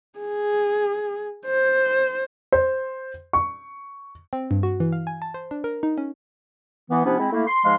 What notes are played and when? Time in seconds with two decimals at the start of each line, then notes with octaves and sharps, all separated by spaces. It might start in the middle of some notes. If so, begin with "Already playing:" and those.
0.18 G#4
1.46 C5
2.52 C5
3.33 C#6
4.33 C4
4.51 G2
4.63 F#4
4.80 E3
4.92 F5
5.07 G#5
5.22 A5
5.34 C5
5.51 D4
5.64 A#4
5.83 D#4
5.98 C#4
6.91 E3 B3
7.05 C3 F3 B3 C#4 D4 E4
7.19 G#3 C4 E4
7.32 A3 A#3 E4
7.47 C6
7.65 G#2 F3 G#3 F5 C6